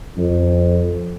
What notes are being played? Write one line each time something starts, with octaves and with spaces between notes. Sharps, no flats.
F2